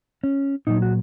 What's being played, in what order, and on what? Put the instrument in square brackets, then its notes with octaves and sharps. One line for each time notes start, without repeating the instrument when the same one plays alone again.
[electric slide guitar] C#4
A#2 F#3 D#4
F#4